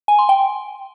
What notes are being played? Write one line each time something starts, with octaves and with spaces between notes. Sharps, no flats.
G#5
C6
G5